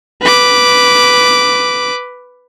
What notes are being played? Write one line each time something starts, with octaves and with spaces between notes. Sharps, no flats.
B4 D6